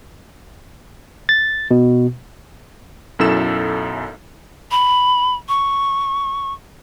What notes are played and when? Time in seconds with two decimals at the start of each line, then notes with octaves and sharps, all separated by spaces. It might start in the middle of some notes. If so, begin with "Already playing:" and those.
1.29 A6
1.71 B2
3.19 B1 F#2 E4 A4 E6 E7
4.71 B5
5.49 C#6